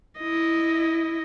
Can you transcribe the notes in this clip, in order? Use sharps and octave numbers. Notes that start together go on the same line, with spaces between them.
E4 D#5